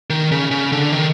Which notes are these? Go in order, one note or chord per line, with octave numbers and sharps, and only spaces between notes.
D#3
C#3
C#3
D3
D#3